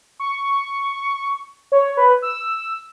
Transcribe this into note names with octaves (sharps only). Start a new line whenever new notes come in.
C#6
C#5
B4
E6